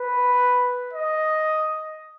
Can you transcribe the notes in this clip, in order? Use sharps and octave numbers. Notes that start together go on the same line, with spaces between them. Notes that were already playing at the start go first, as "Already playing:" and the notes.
Already playing: B4
D#5